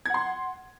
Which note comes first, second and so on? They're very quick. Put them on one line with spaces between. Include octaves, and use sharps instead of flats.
G#6 F#5 C6